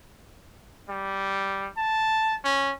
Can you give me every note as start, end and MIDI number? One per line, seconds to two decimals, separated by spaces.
0.89 1.69 55
1.77 2.36 81
2.44 2.73 61